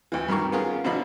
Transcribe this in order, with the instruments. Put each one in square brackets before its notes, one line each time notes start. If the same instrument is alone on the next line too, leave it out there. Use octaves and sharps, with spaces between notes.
[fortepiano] D2 E3
G2 D#3 A#4 C#6
B3 C#4 F4 G#4 A#4
B2 D3 F3 D4 D#4 B5